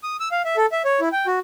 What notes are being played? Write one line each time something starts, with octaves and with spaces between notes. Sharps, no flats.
D#6
E6
F5
E5
A4
E5
C#5
E4
G5
F#4